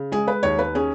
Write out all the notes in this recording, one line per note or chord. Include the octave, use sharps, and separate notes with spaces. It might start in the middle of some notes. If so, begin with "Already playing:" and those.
Already playing: C#3
G#3 G#4
B4
D#2 C#5
B4
C#4 G#4